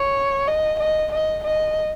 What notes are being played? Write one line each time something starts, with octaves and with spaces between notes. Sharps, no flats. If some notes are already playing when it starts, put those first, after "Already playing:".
Already playing: C#5
D#5
D#5
D#5
D#5